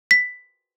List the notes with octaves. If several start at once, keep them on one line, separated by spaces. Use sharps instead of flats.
B6